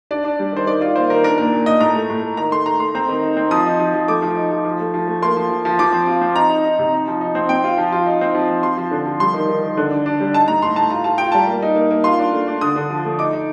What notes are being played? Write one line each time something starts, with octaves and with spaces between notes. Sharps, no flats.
D4 D5
D4
G3
D#3 C5
D#3 D5
F4 D5
A#3 C5
D#3 A#4
D4 A#4
A#2 A#4
A#2
A#2 D#5
A2 A#5
A3
A2
A3
D#3 A#5
A3 C6
A3 A#5
A3 C6
C4 A#5
D#3
D#4
C4
F3 D#6
D#4
F3
F3
A3 D6
F3
D#4
F3
F3
A3
F3
A3
A#3 C6
F3
F3
F3
F3 D6
C4
F4
C4
D#4 A#5
D#4
D#4
C3
D#4
F3
D#4
C4
C4 G5
F4
F3
F4
D#4
C4
F3
C4
F3 C6
F3
D3
F3
G3 C6
D#3
D#3
D#3
D3
D4
D4
G3
D#4 A5
A2 A#5
A2 C6
A2 A5
F4 A#5
F4 A5
F4 G5
G3 A5
A#3
D#4
A#3
A#3
F4 C6
D4
A3
D4
D3 D#6
D3
F3
A3
D#4 D6
D#4